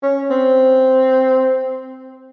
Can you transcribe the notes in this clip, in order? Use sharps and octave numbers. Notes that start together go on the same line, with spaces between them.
C#4
C4